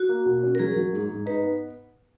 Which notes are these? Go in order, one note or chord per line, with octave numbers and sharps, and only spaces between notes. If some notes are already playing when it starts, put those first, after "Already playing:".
Already playing: F#4
A#3
B2
C#4
A#4
F#3 G#4
F#3
G#2
G#2
D#4 B4
B3